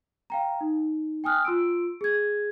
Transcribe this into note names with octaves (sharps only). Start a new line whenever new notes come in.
F5 G5 A#5
D#4
G5 G#5 D#6 F6 F#6
F4 C6 E6 D7
G#4 G#6